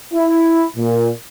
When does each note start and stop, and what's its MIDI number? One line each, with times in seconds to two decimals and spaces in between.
0.14 0.66 64
0.77 1.09 46